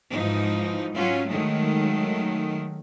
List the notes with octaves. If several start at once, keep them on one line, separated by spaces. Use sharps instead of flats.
G#2 E3 F3 D#4
F#3 C#4 F4
D#3 F#3 G#3 A3